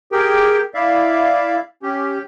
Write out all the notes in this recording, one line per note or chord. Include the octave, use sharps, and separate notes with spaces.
G4 G#4 A#4 G5
E4 D5 E5 F5
C#4 G4